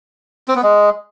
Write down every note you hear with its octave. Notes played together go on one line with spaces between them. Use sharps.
C4
B3
G#3